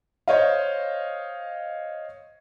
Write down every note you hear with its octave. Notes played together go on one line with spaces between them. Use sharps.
C5 C#5 D#5 F5